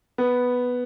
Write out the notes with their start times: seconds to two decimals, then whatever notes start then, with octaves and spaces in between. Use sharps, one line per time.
0.18 B3